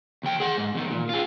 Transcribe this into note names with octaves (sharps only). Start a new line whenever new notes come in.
D#2 G5
G#4 F#5
G#2
E2 D#3
A#2
F4 G#4